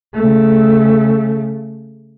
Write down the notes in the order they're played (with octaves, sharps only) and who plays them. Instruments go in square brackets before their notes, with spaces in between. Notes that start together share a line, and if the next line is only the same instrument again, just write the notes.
[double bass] C#3 A3